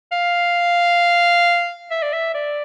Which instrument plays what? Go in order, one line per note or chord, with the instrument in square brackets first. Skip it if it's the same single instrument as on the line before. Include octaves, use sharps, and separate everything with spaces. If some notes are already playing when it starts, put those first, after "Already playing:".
[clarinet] F5
E5
D5
E5
D5